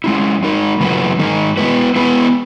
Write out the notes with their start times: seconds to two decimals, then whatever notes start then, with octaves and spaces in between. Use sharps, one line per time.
0.04 G#3 C#4 E4
0.43 G#3 D#4 A#4
0.80 C#3 F#3 A#3 E4 B4
1.19 D#3 G#3 D#4 A#4
1.57 G#3 B3 E4 B4
1.96 G#3 B3 E4 B4